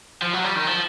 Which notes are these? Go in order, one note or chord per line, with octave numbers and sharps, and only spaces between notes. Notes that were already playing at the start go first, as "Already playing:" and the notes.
F3
F#3
G3
D#3
F3